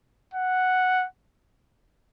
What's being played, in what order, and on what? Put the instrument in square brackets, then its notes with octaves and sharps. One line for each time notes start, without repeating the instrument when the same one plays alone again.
[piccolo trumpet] F#5